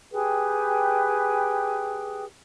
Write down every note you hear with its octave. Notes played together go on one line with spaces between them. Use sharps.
G4 G#4 B4 G5